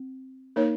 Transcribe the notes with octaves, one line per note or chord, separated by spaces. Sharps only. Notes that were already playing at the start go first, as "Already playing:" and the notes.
Already playing: C4
A#3 D#4 A#4 C#5